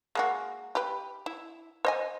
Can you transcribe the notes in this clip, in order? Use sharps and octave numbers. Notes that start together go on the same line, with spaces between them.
G#3 A#3 F#4
G4 B4
E4
C5 D#5 G#5